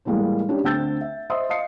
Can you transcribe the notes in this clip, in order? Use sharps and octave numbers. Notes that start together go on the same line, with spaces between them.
A2 E3 G3 G#3 A#3
C#4 D4 G4
D2 C4 G5 E6 G6 A6
E5
C5 D#5 E5 C6 D#6
D#5 F5 D#6 C7 C#7